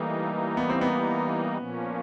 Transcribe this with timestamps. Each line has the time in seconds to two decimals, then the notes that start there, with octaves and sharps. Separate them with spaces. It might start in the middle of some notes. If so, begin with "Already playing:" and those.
Already playing: E3 G3 A3 A#3 D#4
0.57 B3
0.70 C4
0.81 B3
1.57 A#2 F3 A#3 C#4